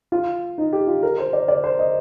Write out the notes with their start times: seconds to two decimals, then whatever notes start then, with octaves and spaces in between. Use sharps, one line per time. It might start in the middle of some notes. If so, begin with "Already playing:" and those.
0.12 F4
0.58 D#4
0.73 G4
0.87 F4
1.03 A#4
1.18 C5
1.33 D5
1.48 D5
1.64 C5
1.79 D#5